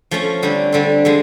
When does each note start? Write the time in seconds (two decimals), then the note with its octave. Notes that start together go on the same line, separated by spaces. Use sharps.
0.11 F3 A3 C#4
0.42 D3 G3 C4
0.72 D3 G3 C4
1.05 D3 F3 G#3